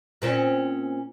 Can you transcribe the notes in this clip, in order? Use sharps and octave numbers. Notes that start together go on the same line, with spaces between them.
A#2 C4 C#4